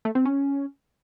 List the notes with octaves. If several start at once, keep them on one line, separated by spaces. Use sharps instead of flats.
A3
C4
C#4